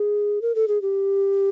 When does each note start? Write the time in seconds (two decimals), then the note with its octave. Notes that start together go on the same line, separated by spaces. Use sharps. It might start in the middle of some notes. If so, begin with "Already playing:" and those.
Already playing: G#4
0.42 A#4
0.55 A4
0.68 G#4
0.82 G4